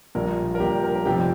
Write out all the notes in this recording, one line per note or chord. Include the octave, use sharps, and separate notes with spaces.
A#1 A#2 G3 A#4
A#4
A#1 A#2 G3 G4
A#4
A#4
F1 F2 C3 F3 G4